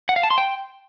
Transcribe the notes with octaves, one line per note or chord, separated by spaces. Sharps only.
F#5
F5
A5
C6
G5